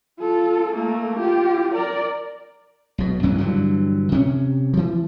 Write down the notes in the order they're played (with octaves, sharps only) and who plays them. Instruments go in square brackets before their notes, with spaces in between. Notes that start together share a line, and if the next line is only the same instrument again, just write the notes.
[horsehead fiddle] F4 A4
A3 A#3
F4 G4
A#4 D5
[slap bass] B1 B2
A1 F#2 C#3 E3
G2 D3 E3 F#3
C3 C#4
E3 F3